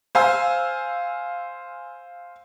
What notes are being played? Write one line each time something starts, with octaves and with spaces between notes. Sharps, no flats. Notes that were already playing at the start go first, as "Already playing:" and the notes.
C5 F5 G#5 E6